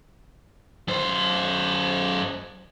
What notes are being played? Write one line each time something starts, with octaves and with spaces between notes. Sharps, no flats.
F#2 C5